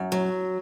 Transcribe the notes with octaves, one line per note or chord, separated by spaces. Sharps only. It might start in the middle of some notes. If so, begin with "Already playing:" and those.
Already playing: F#2
F#3